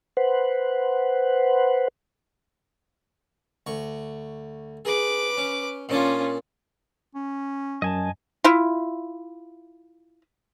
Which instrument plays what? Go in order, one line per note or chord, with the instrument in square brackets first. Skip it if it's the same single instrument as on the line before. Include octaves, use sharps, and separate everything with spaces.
[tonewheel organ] B4 C5 F#5
[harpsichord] D2 C#6
[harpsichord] G#4 [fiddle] B4 D6
[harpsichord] C#4
[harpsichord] A#2 D4 D5 [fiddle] C#4 F4
[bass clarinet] C#4
[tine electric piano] F#2 [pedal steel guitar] D#5 G#5 A5
[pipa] E4 F4